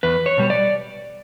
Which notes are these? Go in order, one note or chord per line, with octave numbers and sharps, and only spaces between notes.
E2 B4
C#5
B2 G3
D5